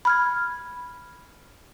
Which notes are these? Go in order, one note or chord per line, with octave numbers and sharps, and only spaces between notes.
B5 F6 G#6